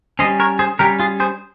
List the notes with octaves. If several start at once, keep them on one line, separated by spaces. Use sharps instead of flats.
G3 C#4 C5 D#5
A#4 C#5
G#4 C5
G3 C#4 G4 A#4
F4 G#4
G#4 C5